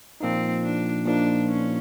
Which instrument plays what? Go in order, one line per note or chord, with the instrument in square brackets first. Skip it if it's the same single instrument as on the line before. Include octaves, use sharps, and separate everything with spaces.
[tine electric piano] A#2 F3 A#3 D#4 [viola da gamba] C4
[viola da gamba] D4
[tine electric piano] A#2 F3 A#3 D#4 [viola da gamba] D4
[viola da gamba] C#4